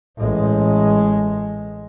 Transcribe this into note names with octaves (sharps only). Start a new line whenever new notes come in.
A1 G#3